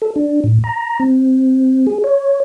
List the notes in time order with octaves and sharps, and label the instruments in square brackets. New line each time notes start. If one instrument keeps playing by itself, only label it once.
[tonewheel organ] A4
D4
A2
A#5
C4
G#4
C#5